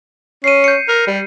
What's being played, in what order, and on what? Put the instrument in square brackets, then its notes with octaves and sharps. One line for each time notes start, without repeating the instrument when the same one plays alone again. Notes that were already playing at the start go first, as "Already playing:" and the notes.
[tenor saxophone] C#4 [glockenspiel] C7 D#7
[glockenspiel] G6 C#7
[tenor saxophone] A#4
G3